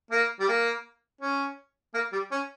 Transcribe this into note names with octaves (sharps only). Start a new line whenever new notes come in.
A#3
G3
A#3
C#4
A#3
G3
C#4